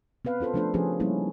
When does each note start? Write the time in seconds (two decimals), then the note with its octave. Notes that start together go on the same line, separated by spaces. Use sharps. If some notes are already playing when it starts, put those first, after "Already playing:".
0.25 B3 C4 B4 F5
0.40 C#4 F4 A4 C5
0.54 F3 A3 D4 F4 A4 C5
0.74 F3 C4 C#4 G4 G#4 B4
1.00 G3 A#3 C#4 D#4 E4